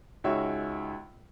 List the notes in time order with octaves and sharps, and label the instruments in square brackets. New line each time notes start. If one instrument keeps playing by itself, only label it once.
[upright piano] C#2 G#3 D#4 F#4 C#5 E5